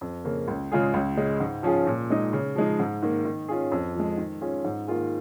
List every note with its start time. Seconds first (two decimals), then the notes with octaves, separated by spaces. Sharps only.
0.01 F2
0.24 C#3 A#3
0.48 C#2
0.72 C#3 G#3 F4 G#4
0.94 C#2
1.17 C#3 G#3
1.40 G#2
1.63 F3 C#4 F4 G#4
1.87 A#2
2.10 G#3 D#4
2.33 C#3
2.56 F3 G#3 D#4
2.80 G#2
3.03 D#3 A#3
3.25 D#3
3.48 C#4 F4 G#4
3.72 F2
3.95 F3 G#3
4.17 D#3
4.41 C#4 F4 G#4
4.65 G#2
4.87 D#3 A#3 F4 G#4